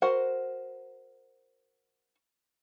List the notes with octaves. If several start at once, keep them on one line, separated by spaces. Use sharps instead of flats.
F#4 A#4 C5 F#5